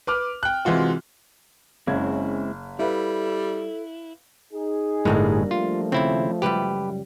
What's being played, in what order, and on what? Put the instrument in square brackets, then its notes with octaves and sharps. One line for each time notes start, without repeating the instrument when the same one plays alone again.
[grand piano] B4 D6 F6
G5 F#6
C3 E3 G#3 F4 F#4
[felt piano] F#1 G#6 [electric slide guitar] G#3 C4 E4 [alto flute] C#4
[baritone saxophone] G3 [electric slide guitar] E4 [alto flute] A4 [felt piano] B4 E5 F5
[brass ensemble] D#4 G#4
[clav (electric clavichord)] G1 A2 G#3 [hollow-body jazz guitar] G3 A#3 D4
[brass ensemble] F3 A3 [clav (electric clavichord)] F4
[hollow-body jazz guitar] D#2 C#3 [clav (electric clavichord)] C4 E4
[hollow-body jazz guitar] C#2 F#2 G3 [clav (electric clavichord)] G4 B4